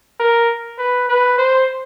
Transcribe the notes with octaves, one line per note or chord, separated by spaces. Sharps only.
A#4
B4
B4
C5